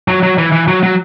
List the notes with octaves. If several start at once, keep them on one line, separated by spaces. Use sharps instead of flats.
F#3
F#3
E3
E3
F#3
F#3